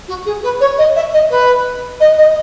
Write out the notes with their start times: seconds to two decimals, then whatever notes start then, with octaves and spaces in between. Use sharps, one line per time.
0.08 F#4
0.25 G#4
0.43 B4
0.60 C#5
0.78 D#5
0.96 E5
1.13 D#5
1.30 B4
2.00 D#5
2.18 D#5